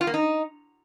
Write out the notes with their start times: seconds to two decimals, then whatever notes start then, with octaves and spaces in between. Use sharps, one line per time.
0.01 F4
0.07 A#3
0.14 D#4